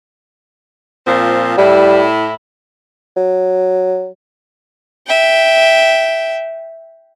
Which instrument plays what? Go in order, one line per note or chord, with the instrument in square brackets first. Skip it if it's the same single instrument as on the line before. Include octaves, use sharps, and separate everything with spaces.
[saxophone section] A#2 F3 C4
[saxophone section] A2 E4 [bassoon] G3
[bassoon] F#3
[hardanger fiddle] E5 G5